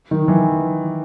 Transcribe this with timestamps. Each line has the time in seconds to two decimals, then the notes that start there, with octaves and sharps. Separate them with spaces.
0.11 D#3
0.28 E3